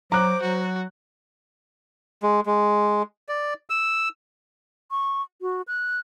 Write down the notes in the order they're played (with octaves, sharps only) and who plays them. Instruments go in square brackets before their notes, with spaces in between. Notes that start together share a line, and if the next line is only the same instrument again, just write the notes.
[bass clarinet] F#3 [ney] C5 [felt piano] A#5 F#6 [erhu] D6
[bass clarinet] F#3 [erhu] F#4
[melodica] G#3
G#3
D5
E6
[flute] C#6
F#4
F#6